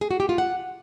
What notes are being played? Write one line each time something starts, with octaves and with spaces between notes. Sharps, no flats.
G#4
F#4
G4
F4
F#5